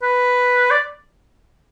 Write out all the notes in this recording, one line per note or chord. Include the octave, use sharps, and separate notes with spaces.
B4
D5